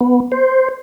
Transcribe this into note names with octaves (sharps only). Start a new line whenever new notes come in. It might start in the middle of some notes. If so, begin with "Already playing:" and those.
B3
C5